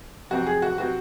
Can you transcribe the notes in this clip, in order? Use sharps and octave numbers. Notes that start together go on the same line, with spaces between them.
F2 C3 F#3 C4 F#4
G#4
F#4
C3 F#3 C4 F#4